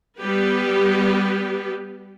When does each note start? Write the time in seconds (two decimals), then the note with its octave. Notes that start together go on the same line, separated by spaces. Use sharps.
0.19 G3 B3 G4 B4